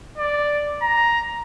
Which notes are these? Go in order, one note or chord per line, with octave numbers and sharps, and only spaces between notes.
D5
A#5